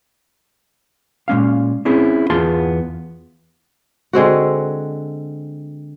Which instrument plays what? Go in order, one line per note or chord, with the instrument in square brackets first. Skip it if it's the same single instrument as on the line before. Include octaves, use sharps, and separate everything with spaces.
[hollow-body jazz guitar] A#2 G#3 C#4 F5
C4 C#4 E4 G#4
E2 B3 F4 G#4 A5 C6
[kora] D3 G#3 C4 F#4